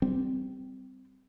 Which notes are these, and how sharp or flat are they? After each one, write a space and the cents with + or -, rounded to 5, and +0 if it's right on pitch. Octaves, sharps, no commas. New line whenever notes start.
G3 +0 C4 -15